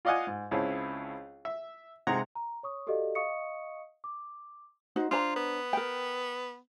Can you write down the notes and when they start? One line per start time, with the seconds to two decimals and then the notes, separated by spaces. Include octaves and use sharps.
0.05 F4 D5 D#5 F5 F#5 G#5
0.27 G#2
0.51 C#2 C4 E4 G#4 C#5 A5
1.45 E5
2.07 C3 G#3 D#4 F#5 A#5 C6
2.35 A#5
2.63 C#5 C#6 D#6
2.87 F#4 G4 A4 D5 D#5 F5
3.15 D#5 F5 C#6 D#6 C#7
4.04 D6
4.96 D#4 F#4 C5
5.11 D4 F4 C5 A#5
5.36 B3
5.73 A#4 G5